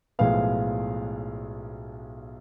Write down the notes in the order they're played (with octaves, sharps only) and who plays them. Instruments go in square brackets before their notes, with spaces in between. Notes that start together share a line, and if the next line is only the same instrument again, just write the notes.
[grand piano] B1 A2 F3 G#3 B3 F5